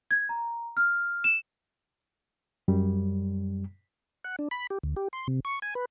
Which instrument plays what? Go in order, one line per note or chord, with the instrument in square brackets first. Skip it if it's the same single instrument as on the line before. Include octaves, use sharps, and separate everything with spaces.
[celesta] G#6
A#5
F6
E7
[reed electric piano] F#2 G3
[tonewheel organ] F#5
D4
B5
G4
D2
G4
C6
C3
C#6
G#5
B4